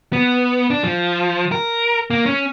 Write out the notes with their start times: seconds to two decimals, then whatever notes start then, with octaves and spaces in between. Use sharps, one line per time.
0.13 B3
0.70 D4
0.84 F3
1.52 A#4
2.10 A#3
2.26 C#4